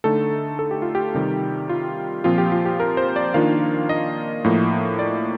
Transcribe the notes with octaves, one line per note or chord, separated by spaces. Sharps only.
D3 A3 D#4 A4
A4
G4
F4
G4
C3 D#3 G3
F4
A#2 F3 C4 F4
G4
F4
G4
A#4
C5
D5
D#3 A#3 D4 F4 F5
D#5
A2 F3 A#3
D5